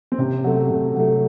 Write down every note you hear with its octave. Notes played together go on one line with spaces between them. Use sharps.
C4
C3 C#4
F#3 A3
C3
F#3 A3